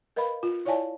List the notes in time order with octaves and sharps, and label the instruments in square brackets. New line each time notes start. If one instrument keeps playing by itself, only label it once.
[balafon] A#4 B4 D#5 F5 B5
F4
E4 C#5 D5 F5 G#5 A5